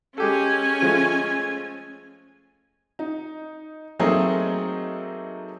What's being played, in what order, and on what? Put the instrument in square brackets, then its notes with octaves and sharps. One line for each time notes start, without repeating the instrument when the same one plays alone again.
[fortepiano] G#3 G4 A4 [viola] C#4 G#5
[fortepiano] F3 G#3 A3
[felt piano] D#4
F#3 A3 A#3 C4 D#4 G#4